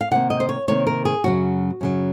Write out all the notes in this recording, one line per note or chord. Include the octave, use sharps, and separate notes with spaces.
F5
C3 D#3 A#3 F#5
D#5
C5
C#5
C3 D#3 A#3 C#5
A#4
G#4
F#2 C#3 F#3 F#4
F#2 C#3 F#3